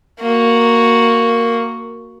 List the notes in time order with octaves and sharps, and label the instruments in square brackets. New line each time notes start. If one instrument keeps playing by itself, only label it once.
[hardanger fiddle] A#3 F#4